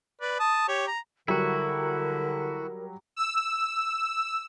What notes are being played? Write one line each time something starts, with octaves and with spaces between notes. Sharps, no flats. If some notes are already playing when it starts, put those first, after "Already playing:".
B4 D5
A5 D#6
G4 C#5
A#5
D3 F#3 G3 E4 F#4 A#4
E6